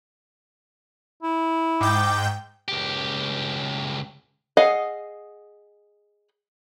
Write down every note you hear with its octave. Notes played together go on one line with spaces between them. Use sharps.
E4
G#2 G5 D6 G6
C#2 G4
G#4 D#5 F5 F#5